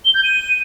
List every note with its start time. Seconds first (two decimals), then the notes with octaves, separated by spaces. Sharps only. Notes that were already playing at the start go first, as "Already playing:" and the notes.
0.05 G7
0.14 G6
0.24 D#7